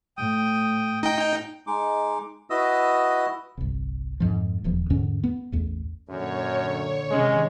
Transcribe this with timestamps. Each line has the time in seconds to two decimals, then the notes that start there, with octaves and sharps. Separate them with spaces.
0.17 A2 G5 D#6
1.03 D#4 G5
1.67 G#3 D#4 D6
2.50 E4 F#4 B4 D#5 D#6 E6
3.57 G1 C2
4.20 F2 G#2 F3
4.64 D#1 E2 F3
4.90 E2 G#2 D3 C#4
5.24 B3
5.52 A1 E2
6.09 F#2 A#2 D3 C#5
7.10 C3 D#3 G#3 C#4